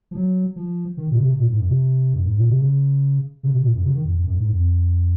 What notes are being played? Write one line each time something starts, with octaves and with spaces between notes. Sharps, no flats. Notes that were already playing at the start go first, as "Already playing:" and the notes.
F3
F#3
F3
D#3
A#2
C#3
C3
A#2
G#2
F#2
C3
F#2
G#2
A#2
C3
C#3
C#3
C3
A#2
F#2
C#3
D#3
F2
F2
F#2
G#2
F2